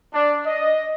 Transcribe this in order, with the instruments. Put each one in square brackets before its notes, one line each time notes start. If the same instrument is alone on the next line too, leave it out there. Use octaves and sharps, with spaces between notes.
[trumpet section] D4
D#5